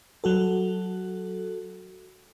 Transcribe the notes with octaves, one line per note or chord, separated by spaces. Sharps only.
F#3 F#4 A4